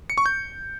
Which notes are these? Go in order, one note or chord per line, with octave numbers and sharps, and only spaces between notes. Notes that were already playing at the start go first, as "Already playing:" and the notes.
C#7
C#6
G6